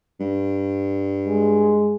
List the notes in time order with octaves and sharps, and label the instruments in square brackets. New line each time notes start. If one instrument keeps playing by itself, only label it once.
[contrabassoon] G2
[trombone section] G#3